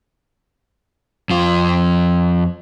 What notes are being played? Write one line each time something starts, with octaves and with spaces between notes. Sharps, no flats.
F2 F4